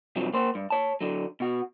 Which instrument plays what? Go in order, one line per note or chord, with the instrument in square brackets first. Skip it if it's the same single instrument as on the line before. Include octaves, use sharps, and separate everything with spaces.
[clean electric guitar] G2 C3 F3 F#3
A#3 C5
G2
C#5 A5
D3 F#3
B2 F#4